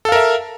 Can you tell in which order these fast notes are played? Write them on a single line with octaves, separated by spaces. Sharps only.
A4 F5 A#4 E5